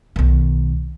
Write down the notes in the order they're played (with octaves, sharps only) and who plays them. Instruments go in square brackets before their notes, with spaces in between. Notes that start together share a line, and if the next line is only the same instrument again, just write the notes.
[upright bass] B1 D#3